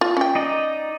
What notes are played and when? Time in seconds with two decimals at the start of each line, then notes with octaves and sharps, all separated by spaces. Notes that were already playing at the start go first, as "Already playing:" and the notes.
0.01 F4
0.17 C#4 G5
0.35 D#4 D5 D#5